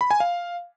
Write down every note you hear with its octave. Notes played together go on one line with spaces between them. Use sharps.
B5
G#5
F5